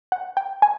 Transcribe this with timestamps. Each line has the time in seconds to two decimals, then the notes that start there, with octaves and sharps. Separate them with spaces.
0.12 F#5
0.37 G5
0.62 G#5